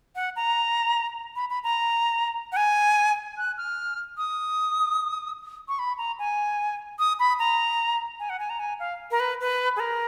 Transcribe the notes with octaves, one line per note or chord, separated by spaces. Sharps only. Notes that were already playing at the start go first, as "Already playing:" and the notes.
F#5
A#5
B5
B5
A#5
F#5
G#5
F#6
F6
D#6
C#6
B5
A#5
G#5
D#6
B5
A#5
G#5
F#5
G#5
A#5
G#5
F5
A#4
B4
B4
G#4
A#4